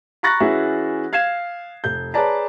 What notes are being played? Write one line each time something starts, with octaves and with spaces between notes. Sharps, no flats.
A#5 B5 C#6 F#6 A6 A#6
E3 C#4 F#4 G#4 E5
F5 G#6 C7 E7
F1 G6
G#4 B4 C#5 D5 A5 A#5